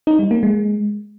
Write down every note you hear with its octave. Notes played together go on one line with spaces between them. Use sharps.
D#4
G3
A#3
G#3